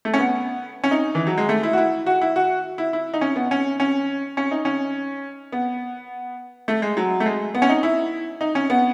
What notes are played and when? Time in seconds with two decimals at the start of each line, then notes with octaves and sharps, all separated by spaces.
0.05 A3
0.14 C#4
0.19 B3
0.84 C#4
0.91 D#4
1.15 E3
1.27 F#3
1.38 G#3
1.49 A3
1.63 E4
1.73 F#4
1.78 E4
2.06 F#4
2.21 E4
2.36 F#4
2.78 E4
2.93 E4
3.14 D#4
3.21 C#4
3.36 B3
3.51 C#4
3.80 C#4
4.37 C#4
4.51 D#4
4.65 C#4
5.52 B3
6.68 A3
6.82 G#3
6.97 F#3
7.20 A3
7.26 G#3
7.55 B3
7.62 C#4
7.69 D#4
7.83 E4
8.41 D#4
8.55 C#4
8.70 B3